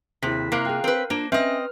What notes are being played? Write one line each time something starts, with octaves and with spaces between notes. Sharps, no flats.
D#2 C3 E4 G#4 C5 B6
C3 A#3 A#5 F#6 C7
F4 G#4 F5 G5
C4 A#4 B4
A#3 D4 F4 C5
C4 C#4 B4 D#5 E5 F6